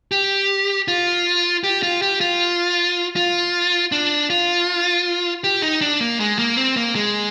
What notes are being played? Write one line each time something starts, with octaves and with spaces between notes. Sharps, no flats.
G4
F4
G4
F4
G4
F4
F4
D4
F4
G4
D#4
D4
A#3
G#3
A#3
C4
A#3
G#3